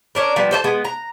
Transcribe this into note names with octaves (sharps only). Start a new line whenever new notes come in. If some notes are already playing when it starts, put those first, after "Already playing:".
C#4 D4 A#4
F3 G3 B3
A4 C5 D5 A5
G#3 B3
A#5